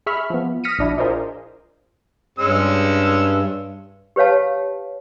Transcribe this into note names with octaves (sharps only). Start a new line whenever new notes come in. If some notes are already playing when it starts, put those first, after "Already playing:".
G#4 E5 B5 C#6 F6
F3 B3
D#6 F6 A#6 B6 C#7 D#7
A#1 D4 E4 F#4
F4 G#4 A#4 C5 D5 D#5
G2 G#3 C#4 E6
G4 B4 C#5 F5 A5